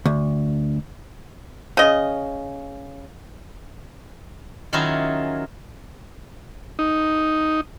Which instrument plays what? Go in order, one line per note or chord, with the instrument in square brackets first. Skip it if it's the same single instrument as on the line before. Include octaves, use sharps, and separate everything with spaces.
[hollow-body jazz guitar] D2
[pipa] C#3 D#5
[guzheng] D#3 F#3 C#4 E4 F4 G#4
[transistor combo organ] D#4